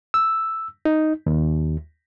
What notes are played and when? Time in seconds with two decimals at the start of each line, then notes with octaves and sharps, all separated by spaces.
0.14 E6
0.85 D#4
1.26 D#2